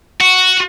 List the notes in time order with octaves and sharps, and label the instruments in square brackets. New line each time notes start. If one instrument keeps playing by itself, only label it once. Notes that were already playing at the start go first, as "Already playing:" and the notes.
[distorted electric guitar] F#4